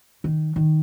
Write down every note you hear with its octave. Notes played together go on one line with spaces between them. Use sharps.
D#3
D#3